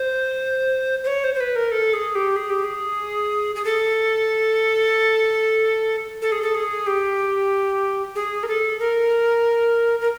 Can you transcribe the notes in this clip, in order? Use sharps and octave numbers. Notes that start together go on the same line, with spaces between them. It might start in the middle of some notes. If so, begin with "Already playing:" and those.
Already playing: C5
C5
C#5
C5
C5
B4
A#4
A4
G#4
G4
G#4
G4
G#4
G#4
A4
A4
G#4
A4
G#4
G4
G#4
A#4
A4
A#4
A#4